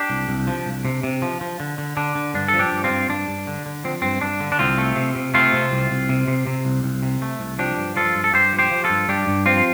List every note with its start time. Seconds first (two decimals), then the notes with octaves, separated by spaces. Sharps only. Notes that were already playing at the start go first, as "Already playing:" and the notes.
Already playing: D4 G4
0.10 C2
0.29 C2
0.47 F3
0.66 C2
0.85 C3
1.03 C3
1.22 F3
1.41 F3
1.60 D3
1.78 D3
1.97 D3 D4
2.15 D3
2.34 G2 D4
2.48 A4
2.54 F3
2.59 D4 G4
2.72 G2
2.84 C4 F4
2.90 G2
3.09 G2 D4
3.28 G2
3.47 D3
3.66 D3
3.84 F3 C4
4.02 G2 C4
4.21 G2 D4
4.40 D3
4.52 D4
4.59 C2 C4 F4
4.78 A3
4.96 C3
5.16 C3
5.34 A3 C4 F4
5.53 C3
5.72 C2
5.91 C2
6.09 C3
6.28 C3
6.47 C3
6.65 C2
6.84 C2
7.03 C3
7.22 A3
7.40 C2
7.59 F3 D4 G4
7.78 G2
7.96 F3 F4 A4
8.15 G2
8.24 A4
8.34 G2 G4 C5
8.53 F3
8.59 G4 C5
8.71 F3
8.84 F4 A4
8.90 G2
9.09 G2 D4 G4
9.27 G2
9.46 F3 C4 F4